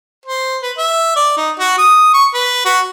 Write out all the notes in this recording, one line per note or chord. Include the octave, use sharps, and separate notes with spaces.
C5
B4
E5
D5
D#4
F#4
D#6
C#6
B4
F#4